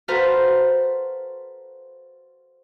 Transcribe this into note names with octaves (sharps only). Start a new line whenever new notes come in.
F#4 A4 B4 C5 F5 A#5